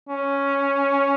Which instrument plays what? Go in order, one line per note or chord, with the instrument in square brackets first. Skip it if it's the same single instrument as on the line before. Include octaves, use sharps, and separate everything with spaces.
[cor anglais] C#4